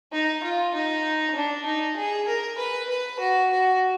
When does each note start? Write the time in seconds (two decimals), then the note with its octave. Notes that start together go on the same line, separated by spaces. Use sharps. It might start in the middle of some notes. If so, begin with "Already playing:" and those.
0.12 D#4
0.43 F4
0.74 D#4
1.35 D4
1.66 D#4
1.96 G#4
2.27 A#4
2.58 B4
2.89 B4
3.19 F#4
3.50 F#4